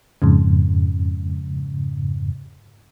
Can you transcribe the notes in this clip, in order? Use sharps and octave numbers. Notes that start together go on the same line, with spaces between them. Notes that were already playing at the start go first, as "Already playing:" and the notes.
F2 G#2 C#3